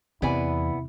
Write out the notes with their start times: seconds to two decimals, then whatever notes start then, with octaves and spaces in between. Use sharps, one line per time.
0.22 E2 C3 B3 E4 D5 G#5